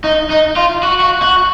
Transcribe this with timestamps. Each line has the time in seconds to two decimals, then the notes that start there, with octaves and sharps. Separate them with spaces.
0.04 D#4
0.30 D#4
0.56 F4
0.83 F#4
1.00 F#4
1.22 F#4